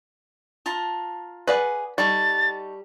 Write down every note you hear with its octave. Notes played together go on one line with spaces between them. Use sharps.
F4 A5 A#5
G#4 B4 D5 F#5
G3 D#4 A4 C#6 A6